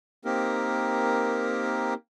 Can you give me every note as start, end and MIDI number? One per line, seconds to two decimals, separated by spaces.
0.25 1.94 58
0.25 1.94 60
0.25 1.94 63
0.25 1.94 67
0.25 1.94 70